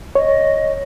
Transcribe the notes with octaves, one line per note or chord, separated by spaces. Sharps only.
C#5 D#5